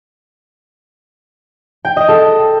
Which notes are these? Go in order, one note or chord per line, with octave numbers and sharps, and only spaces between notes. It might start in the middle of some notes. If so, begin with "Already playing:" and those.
G5
D#5
A4